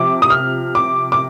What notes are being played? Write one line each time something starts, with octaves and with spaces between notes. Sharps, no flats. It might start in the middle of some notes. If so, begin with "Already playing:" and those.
Already playing: C3 F3 D6
D#6
F6
D6
D6